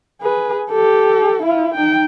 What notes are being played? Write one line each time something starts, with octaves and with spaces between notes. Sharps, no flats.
G#4 B4
G4 A4
E4 F4
D#4 G5